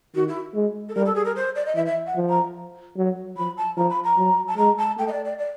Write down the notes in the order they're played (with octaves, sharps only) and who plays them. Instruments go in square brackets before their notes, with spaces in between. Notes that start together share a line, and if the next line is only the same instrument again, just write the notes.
[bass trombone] D#3 [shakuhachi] F#4
[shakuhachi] E4
[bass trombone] G#3
[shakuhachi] A4
[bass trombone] G3 [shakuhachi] A#4
[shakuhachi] A4
G#4
A#4
C5
D5
D#5
[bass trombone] E3 [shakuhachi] E5
[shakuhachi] E5
F#5
[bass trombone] F3
[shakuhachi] A#5
[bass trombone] F#3
[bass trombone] F3 [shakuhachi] B5
[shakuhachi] A5
[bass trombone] F3 [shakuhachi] A#5
[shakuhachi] B5
A#5
[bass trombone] F#3
[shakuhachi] A5
[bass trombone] G#3 [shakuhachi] A#5
[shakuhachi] A5
[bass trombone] A3 [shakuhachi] G5
[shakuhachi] D#5
D5
D5
D5